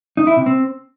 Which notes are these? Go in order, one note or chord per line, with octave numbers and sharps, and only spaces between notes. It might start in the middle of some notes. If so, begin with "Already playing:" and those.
D#4
E4
C3
C4